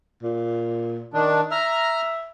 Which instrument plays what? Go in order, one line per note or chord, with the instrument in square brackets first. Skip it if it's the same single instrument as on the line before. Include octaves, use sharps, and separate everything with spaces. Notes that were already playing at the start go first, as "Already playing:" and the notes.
[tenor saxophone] A#2
[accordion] D#3 D4
[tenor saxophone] E5 [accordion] A#5 F6